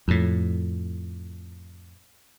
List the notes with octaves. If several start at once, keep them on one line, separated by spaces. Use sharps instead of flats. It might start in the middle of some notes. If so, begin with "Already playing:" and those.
F2 A2